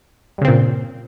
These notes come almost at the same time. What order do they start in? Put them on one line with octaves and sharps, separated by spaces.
G2 C#3 C4 A#2